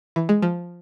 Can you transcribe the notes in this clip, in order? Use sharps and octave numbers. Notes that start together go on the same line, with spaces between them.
E3
G#3
F3